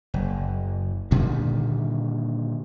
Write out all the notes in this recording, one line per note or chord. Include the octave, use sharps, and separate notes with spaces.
F#1
A#2 D3 D#3 G3